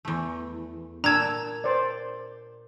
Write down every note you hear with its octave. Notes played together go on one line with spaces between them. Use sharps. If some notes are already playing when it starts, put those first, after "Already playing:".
E2 A3
A#2 D4 A5 A#5 E6 G#6
C5 D5